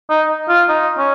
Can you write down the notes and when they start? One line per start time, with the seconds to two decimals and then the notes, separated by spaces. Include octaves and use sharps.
0.10 D#4
0.49 F4
0.69 D#4
0.98 C#4